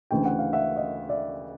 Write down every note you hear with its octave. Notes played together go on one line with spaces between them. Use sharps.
D2 C#3 E3 G5
F#5
F5
E5 F#5
D#5 F5
D5 E5